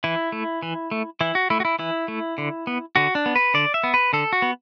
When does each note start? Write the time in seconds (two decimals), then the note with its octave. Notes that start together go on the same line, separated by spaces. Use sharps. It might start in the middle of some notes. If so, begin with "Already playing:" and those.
0.04 E3 E4
0.32 A3
0.63 E3
0.91 A3
1.21 E3 E4
1.35 F#4
1.50 A3 E4
1.60 F#4
1.65 E4
1.79 E3 E4
2.08 A3
2.38 D3
2.67 B3
2.96 D3 F#4
3.15 D4
3.26 B3
3.36 B4
3.54 D3 D5
3.74 E5
3.84 B3
3.94 B4
4.13 D3 A4
4.33 F#4
4.42 B3